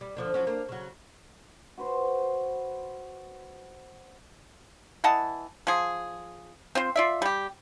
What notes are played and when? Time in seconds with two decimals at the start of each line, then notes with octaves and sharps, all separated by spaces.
0.01 G3
0.17 D3 F3 D4
0.34 F3 F#3 C#4
0.47 A#3 D4
0.69 C#3 F#3
1.78 F#4 B4 C5
5.04 E3 D#5 F#5 A5
5.67 F3 G#4
6.75 C4 F4 C5
6.96 F4 D5 E5
7.22 G3 G4